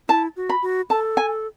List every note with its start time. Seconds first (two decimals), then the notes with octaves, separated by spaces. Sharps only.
0.09 E4 A5
0.37 F#4
0.49 B5
0.62 F#4
0.90 A4 A5
1.17 G#5